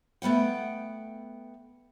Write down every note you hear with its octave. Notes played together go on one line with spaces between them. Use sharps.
A3 B3 F#5 G5